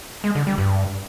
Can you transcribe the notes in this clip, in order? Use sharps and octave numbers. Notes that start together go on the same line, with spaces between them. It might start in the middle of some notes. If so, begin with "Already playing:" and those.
G#3
D3
G3
G2